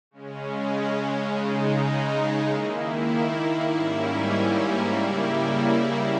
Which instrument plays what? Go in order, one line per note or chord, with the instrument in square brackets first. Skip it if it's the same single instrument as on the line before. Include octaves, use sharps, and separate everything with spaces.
[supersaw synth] C#3 G#3 C#4
C#3 G#3 D#4
D#3 A#3 E4
G#2 G3 A#3 C#4 E4
C#3 G3 A#3 E4